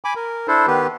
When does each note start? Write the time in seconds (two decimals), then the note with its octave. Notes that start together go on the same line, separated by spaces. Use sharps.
0.05 G#5 B5 D6
0.16 A#4
0.48 D4 E4 A4 C5
0.67 D#3 B3 G4 B4